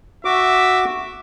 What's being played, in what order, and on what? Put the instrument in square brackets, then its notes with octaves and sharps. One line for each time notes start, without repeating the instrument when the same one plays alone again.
[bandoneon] F#4 D6 [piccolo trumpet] E5